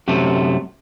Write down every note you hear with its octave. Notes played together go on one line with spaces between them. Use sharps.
F#2 C3 A3